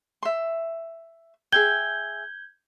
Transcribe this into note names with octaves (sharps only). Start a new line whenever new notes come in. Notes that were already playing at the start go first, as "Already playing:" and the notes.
E5 C6
G#4 E5 G5 G6 G#6 G7